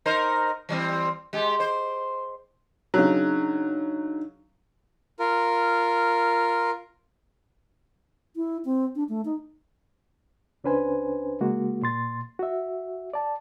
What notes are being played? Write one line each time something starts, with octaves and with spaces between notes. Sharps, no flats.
D#4 A#4 C5
E3 G3 C4
G#3 G4
C5
C#3 F#3 D4 D#4
F4 A#4
E4
C4
D4
A3
D#4
C#2 C#4 D4 B4 C5 G#5
C#3 G#3 A#3 F#4
A#2 C6 A6
F#4 E5
D5 A5